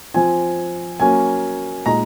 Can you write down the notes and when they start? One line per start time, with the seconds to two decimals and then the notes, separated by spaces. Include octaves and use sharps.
0.14 F3 C4 F4 G#5
1.00 F#3 A#3 C#4 G#5
1.86 A#2 G#3 D#4 A#5